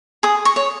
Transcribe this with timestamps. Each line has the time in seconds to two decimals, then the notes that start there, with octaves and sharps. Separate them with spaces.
0.23 G#4 D#6
0.45 C#6
0.56 C#5